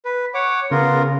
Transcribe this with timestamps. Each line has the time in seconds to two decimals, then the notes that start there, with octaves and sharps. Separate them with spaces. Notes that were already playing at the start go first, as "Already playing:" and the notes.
0.05 B4
0.34 C#5 F#5 D6
0.71 C#3 B3 F4 A#4